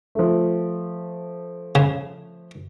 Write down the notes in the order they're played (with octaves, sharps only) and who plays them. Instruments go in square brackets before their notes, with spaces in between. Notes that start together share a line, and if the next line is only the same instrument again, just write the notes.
[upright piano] F3 A3
[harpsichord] C#3